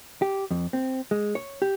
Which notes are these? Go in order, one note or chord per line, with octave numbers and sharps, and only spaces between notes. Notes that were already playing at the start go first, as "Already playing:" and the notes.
G4
F2
C4
G#3
C#5
G4